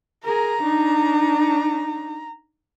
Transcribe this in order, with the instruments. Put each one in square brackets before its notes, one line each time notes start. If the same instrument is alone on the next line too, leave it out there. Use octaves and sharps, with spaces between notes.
[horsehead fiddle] G#4 A#4 [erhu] A#5
[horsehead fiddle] D4 D#4